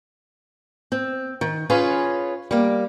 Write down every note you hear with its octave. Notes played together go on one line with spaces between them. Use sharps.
C4
D#3
C#4 F4 G#4 B4 C#5
G3 A#3